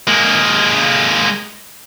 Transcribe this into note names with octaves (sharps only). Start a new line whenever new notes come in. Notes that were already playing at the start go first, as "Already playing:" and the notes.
G#3 A#3